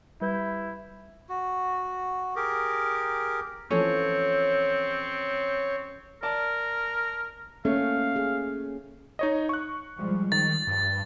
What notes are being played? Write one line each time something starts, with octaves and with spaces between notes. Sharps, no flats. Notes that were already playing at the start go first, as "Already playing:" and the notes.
G3 E4 B4 G6
F#4
G4 G#4 A#4 D6
E3 F3 C4 C#4 A4 C#5
A#4 D5 A5
A3 A#3 C#4 C#5 F5
G#4
D#4 C#5 D#5
C#6 F#6
F3 G3 G#3
D#3 F3 A6
G2